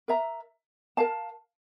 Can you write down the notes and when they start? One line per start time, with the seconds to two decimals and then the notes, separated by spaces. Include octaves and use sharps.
0.08 A#4 E5 A#5
0.97 A#4 F5 A5